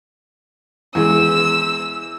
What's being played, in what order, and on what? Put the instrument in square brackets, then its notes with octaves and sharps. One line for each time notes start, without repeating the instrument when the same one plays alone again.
[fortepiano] E2 G#3 [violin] E6